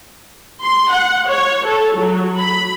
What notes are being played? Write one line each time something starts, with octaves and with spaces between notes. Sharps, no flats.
C6
F#5
C#5
A4
F#3
B5